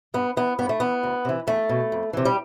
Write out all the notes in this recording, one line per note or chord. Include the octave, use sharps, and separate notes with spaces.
G2 B3
E3 B3
G2 B3
A3
E3 B3
D2
C3 E3
E2 A3
B2
F2
C3 E3
G3